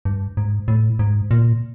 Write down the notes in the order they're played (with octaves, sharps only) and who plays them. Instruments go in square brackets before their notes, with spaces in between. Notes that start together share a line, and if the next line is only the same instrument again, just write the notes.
[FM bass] G2
G#2
A2
G#2
A#2